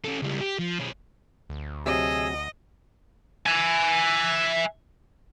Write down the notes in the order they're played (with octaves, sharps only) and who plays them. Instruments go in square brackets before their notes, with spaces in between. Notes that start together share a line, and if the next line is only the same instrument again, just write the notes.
[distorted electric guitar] C#4 A4
C#2 G3
G4
F3
B1 C#4
[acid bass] D2
[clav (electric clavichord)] C3 F#3 [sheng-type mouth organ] G#4 E6 [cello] D#5
[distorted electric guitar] E5 G#5